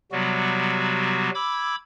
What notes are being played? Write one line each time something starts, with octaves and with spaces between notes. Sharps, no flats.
C3 F#3 G3 B3 F#4
B5 D6 E6 G#6